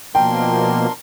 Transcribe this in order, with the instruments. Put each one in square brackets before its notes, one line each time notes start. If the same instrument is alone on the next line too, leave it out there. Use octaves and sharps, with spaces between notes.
[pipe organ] B2 F3 A#3 [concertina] D4 A#4 C6 [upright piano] G5